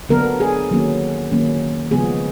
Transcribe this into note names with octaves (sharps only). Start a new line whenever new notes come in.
D3 F#3 B3 D4 A#4
G#4
D#3 F#3 A#3 C#4
D#3 F#3 A#3 C#4
C#3 F3 G#3 B3 G#4